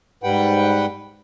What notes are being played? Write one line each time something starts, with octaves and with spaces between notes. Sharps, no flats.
G#2 G3 B4 F#5 G5